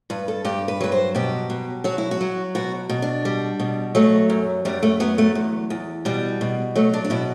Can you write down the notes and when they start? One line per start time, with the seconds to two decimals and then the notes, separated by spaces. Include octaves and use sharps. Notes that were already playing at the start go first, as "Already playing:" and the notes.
0.10 G2 B4
0.28 A4
0.45 G2 G4
0.68 B4
0.80 F#3 B4
0.92 C5
1.15 B2 G4
1.50 B2
1.84 F#3 F#4
1.98 E4
2.11 F#4
2.21 F#3
2.55 B2 F#4
2.89 B2
3.02 D4
3.25 G3
3.60 B2
3.95 F#3 A3
4.30 F#2
4.65 F#2 G3
4.83 A3
5.00 F#3 B3
5.18 A3
5.35 E2
5.70 E2
6.05 B2 G3
6.41 B2
6.76 F#3 A3
6.93 D4
7.04 D4
7.10 B2 E4